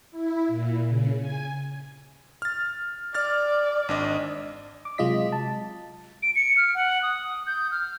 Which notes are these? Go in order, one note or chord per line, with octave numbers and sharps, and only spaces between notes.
E4
A#2
C#3
G#5
F6 A6
D5 F6 A6
G#1 D4 D#5
D6
C3 F#3 G#3 F4 D#5 B6
A5
D7
C#7
F6
F#5
D#6
G6
F6